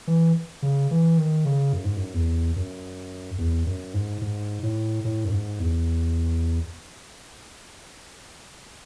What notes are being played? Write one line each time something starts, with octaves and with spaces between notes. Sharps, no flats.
E3
C#3
E3
D#3
C#3
F#2
G#2
F#2
E2
F#2
E2
F#2
G#2
G#2
A2
A2
F#2
G#2
E2